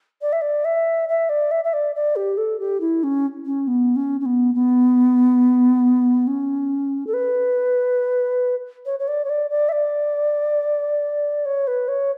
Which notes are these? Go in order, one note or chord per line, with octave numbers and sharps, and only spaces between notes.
D5
E5
D5
E5
E5
D5
E5
E5
D5
D5
G4
A4
G4
E4
C#4
C#4
B3
C#4
C#4
B3
B3
C#4
A4
B4
C#5
C#5
D5
C#5
D5
D5
E5
D5
C#5
B4
C#5